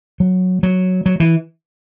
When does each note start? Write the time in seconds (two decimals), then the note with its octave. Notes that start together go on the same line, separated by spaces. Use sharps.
0.20 F#3
0.63 F#3
1.06 F#3
1.20 E3